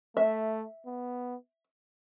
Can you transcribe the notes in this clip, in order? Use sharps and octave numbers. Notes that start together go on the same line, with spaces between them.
A3 E5
B3